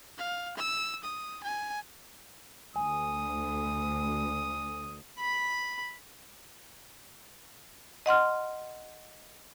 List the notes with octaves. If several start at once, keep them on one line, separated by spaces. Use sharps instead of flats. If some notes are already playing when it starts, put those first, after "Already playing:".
F5
E6
D#6
G#5
D2 G#5 D#6
B5
D#5 F#5 C6 F6